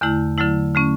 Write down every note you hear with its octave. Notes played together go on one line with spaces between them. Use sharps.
E2 D3 A3 E4
D3 F#3 A3 E4
D3 A3 C#4